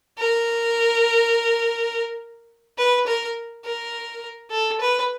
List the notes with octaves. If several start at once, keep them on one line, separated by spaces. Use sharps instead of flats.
A#4
B4
A#4
A#4
A4
B4